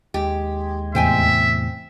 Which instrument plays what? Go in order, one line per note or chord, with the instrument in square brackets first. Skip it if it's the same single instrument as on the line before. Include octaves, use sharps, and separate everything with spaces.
[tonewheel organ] D#2 G#3 [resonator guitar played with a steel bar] G4
[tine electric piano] E2 A2 C3 [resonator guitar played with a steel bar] C5 G5 G#5 [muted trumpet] E5